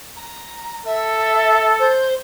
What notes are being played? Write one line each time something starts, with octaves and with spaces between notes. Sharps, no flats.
A#5
A4 E5
C5